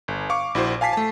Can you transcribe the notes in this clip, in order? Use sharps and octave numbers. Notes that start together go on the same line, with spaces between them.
G1
F5 C#6 D6
A#1 E4 F#4 C5
F5 G#5 A5 B6 C7
A3 A5